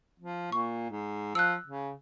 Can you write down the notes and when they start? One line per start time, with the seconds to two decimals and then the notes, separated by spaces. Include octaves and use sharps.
0.20 F3
0.52 A#2 C#6
0.91 G#2
1.35 F3 E6 F#6
1.67 C#3